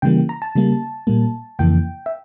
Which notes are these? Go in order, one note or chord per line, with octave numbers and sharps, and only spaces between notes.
C#3 E3 G3 A#3 G5
A#5
A5
C#3 G3 A#3
A#2 G3 A#3
F2 C#3 E3 A#3 G5
E5